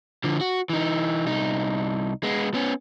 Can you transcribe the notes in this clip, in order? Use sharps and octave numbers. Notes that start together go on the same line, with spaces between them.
D3 F3
F#4
E3 D#4
C2 D#4
G#3 B3
B3 C#4